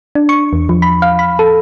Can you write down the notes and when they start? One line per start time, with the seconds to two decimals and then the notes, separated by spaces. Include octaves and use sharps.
0.15 D4
0.29 C#6
0.53 E2
0.69 F3
0.82 B5
1.02 F5
1.19 B5
1.39 A4